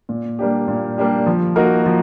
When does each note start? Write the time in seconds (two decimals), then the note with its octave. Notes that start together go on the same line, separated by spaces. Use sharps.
0.09 A#2
0.39 G3 A#3 D4 G4
0.68 A#2
0.98 G3 A#3 D4 G4
1.26 F3
1.56 A#3 D#4 F#4 A#4
1.86 F3